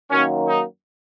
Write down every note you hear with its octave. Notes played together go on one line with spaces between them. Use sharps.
F#2 D#3 F#3 A#3 C#4
D#4